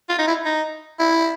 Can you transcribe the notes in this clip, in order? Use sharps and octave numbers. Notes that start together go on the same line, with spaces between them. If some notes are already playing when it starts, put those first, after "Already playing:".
F4
D#4
E4
D#4
E4